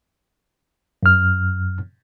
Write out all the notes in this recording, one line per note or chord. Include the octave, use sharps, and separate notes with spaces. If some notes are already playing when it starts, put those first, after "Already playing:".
F#2 F6